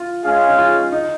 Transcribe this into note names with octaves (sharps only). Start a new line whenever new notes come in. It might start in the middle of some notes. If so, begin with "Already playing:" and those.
Already playing: F4
G#3 C#4 G#4 F5
D#4
F4
D#4